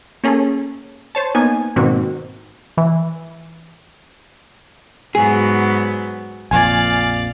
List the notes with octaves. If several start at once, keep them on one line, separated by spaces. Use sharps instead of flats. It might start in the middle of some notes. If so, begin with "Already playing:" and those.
A#3 C#4 G#4 A4
C5 C#5 A5
A#3 B3 D#4 G#5
G#2 B2 D#3 A#3 C4 F#4
E3
G#2 F#3 B3 G#4
A#1 F2 A#2 D5 F5 G#5